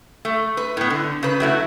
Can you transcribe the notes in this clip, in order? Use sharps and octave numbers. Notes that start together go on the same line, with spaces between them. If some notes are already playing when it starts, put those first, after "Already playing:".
A3
B4
A2 B3
D3
C#3 B4
F#3 A3 E4